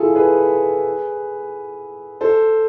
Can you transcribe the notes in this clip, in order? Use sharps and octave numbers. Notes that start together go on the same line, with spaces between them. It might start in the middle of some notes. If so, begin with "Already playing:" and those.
Already playing: E4 F4 G#4 A4
G#4 B4
A4 C5